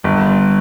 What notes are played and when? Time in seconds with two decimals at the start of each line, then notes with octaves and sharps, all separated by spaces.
0.04 G1 G3